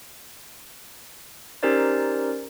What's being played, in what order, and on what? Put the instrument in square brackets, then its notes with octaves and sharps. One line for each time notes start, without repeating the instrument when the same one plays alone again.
[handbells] C#4 D#4 G4 A#4 C5 D5